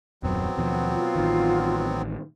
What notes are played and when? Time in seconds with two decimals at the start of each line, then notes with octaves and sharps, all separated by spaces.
0.23 D#1 F#2 F#3 B3 C4
0.57 D#2 B2 F3
0.92 F4
1.16 A1 D#3